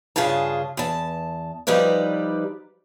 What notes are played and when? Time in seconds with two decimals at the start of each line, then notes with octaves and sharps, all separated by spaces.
0.16 G2 A#2 C#3 F4 G#4 A5
0.77 E2 A5
1.67 F3 G3 D#4 B4 D5